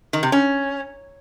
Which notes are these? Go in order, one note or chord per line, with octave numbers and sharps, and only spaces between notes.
D#3
C3
C#4